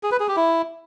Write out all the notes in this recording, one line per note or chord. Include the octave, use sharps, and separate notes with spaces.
G#4
B4
G#4
G4
E4